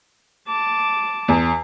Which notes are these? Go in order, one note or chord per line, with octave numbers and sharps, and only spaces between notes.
A5 D6
E2